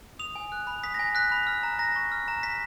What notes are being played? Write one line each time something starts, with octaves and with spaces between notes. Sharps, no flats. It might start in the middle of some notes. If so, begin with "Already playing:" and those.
D#6 F7
G#5
F#6
B5
D#6 B6
A#6
G#5
F#6 B6
B5
F6
A#5
A#5 A#6
C#6
F6
A#5
A#5 B6